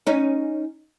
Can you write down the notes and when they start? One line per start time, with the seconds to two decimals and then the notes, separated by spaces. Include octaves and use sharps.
0.07 C#4 D#4